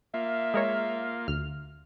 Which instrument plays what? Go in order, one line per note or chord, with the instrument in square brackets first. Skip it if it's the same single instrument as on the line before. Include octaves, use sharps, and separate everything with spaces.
[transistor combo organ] A#3 F4 [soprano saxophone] E5
[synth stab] G#3 A#4 C#5
D2 F6